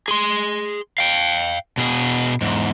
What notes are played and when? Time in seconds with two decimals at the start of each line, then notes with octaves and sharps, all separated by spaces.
0.08 G#4 C6
0.98 F5 G5
1.78 B2 G#4
2.41 E2 G#2